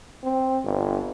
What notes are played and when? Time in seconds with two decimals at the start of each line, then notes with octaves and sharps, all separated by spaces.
0.24 C4
0.64 G1